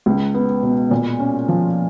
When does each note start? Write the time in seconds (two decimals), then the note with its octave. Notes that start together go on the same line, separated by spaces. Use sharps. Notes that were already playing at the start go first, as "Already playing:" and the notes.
0.06 C#2
0.34 B3
0.63 B2
0.91 A#2
1.20 C#4
1.48 F3